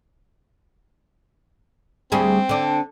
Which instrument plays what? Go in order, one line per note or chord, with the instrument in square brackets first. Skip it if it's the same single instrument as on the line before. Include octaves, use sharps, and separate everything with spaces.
[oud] D2 G3 G#4 [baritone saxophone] C4
[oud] D3 D4